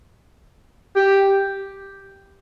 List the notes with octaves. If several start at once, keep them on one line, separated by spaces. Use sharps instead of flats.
G4